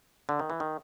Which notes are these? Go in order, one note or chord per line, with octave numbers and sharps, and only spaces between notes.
D3
D#3
E3
D#3